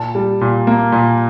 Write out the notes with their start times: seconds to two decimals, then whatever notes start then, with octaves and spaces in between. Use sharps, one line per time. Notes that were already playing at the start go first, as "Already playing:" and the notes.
Already playing: A#2 A5
0.15 G3
0.41 A#2
0.67 A#3
0.92 A#2